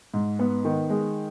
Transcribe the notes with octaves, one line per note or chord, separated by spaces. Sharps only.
G#2
B3
D#3
G#3